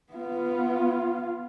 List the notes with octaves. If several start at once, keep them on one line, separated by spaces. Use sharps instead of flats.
B3 F4